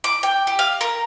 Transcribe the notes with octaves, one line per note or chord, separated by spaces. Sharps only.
D6
G5
G4
F5
A#4